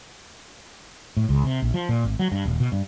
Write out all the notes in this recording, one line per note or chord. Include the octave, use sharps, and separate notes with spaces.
A2
C#2
C3
A#1
F3
A#2
G#1
F#3
G2
D#1
B2
G2